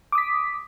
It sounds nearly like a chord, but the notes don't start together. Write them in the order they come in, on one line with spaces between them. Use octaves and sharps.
D6 D#6 B6